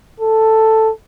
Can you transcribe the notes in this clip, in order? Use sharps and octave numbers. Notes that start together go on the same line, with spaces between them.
A4